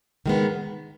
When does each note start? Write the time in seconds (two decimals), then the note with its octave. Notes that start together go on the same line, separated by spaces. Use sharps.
0.26 D#3 G#3 B3